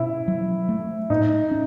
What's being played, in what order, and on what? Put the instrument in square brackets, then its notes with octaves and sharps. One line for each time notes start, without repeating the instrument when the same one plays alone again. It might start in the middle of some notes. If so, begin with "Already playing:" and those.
Already playing: [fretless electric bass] B2 [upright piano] E4
[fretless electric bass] F#3
A3
[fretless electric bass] A2 [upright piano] D#4
[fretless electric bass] C#4